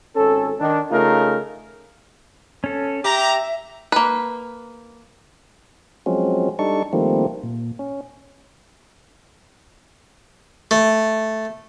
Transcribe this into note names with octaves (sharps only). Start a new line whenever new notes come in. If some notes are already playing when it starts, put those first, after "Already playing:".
G#1 C#4 A4
D#3 D4
C#3 A3 D#4 F4 A#4
C#4 A4
G4 E5 A#5
A#3 B4
F3 F#3 G#3 C4 C#4
G3 D4 D#4 A4 C#6
D#3 F3 G3 A3 A#3 C4
A#2
C#4
A3